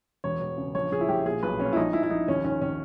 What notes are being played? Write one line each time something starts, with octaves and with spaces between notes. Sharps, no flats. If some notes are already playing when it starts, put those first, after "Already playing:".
E1 C#5
E1
C#3
A#1 C#5
A#1 G#4
E4
A#1 G4
A#2 G#4
B1 B4
A#2 C#4
E4
A#1 D#4
A#1 E4
E4
A#1 D#4
D#2 C#4
D#3 C#4
D#3 C#4